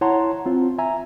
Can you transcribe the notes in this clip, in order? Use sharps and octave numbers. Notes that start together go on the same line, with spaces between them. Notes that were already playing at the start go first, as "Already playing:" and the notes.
E4 C#5 F#5 A5 A#5 C6
C4 F4
E5 G#5 A#5